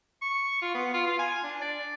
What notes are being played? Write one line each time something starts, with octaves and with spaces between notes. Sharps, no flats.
C#6
F4
B3
F4
F4
G#5
D4
D5